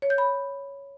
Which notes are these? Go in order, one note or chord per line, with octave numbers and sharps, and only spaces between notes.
C#5
G6
B5